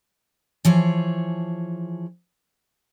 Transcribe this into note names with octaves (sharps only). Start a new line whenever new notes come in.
E3 F3 G#4 C#5